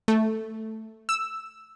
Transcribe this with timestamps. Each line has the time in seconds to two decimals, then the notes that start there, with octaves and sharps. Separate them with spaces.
0.08 A3
1.09 E6